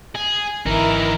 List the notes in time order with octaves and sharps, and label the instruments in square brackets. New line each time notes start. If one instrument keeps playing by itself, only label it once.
[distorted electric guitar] G#4
[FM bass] G#1 [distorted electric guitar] E3 D#4 [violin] E4 A#4